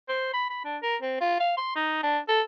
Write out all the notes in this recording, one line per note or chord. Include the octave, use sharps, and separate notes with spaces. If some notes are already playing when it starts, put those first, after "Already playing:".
C5
B5
B5
D4
A#4
C4
F4
F5
C6
D#4
D4
A4